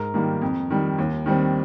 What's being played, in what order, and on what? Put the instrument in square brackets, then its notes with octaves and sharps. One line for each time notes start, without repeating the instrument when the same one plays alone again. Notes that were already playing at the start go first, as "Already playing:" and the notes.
Already playing: [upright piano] G#2 A#4
D#3 G3 A#3
F2
D#3 G3
D#2
D#3 G3 C4